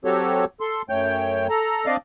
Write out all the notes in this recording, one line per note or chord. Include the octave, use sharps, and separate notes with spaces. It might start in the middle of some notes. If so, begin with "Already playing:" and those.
F#3 C4 F#4 G4 A4 C#5
A4 C6
F#2 A3 C#5 G5 G6
A4 A#5
C4 D4 D5 D#5 F5